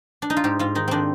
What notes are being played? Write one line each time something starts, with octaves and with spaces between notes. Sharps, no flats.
D4
D#4
F4
G#2 G4
G#2 F4
D#3 D#4
D#3 C4 D4